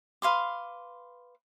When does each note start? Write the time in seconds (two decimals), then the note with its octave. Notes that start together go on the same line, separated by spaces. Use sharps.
0.22 B4 F5 C6 D6